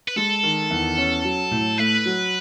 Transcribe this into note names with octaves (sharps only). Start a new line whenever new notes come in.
B4
G#3 A4
D#3
E2
C#4
F#3
A2
A3 B4
F#3